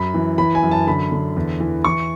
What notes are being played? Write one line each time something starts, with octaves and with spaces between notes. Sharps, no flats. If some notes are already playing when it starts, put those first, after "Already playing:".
Already playing: F#2 B5
E3
E3 B5
G#5
F#2
A5
D3 B5
D3
E2
E3
E3 C#6